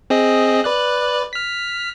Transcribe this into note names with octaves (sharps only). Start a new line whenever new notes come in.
C4 G#4 D#5
B4 D5 F#6
F6 B6